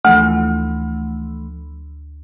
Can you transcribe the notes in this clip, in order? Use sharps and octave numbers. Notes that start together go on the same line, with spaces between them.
D2 E3 F3 A3